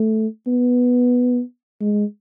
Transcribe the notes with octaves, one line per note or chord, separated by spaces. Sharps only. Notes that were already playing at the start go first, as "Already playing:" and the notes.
Already playing: A3
B3
G#3